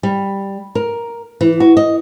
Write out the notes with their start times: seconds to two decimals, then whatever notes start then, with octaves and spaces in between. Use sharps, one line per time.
0.03 G3
0.75 A#4
1.41 E3
1.60 F#4
1.77 D#5